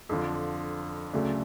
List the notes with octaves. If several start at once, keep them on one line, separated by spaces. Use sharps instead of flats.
F2 D3 F3
D2 C#3 F#3 A3 D4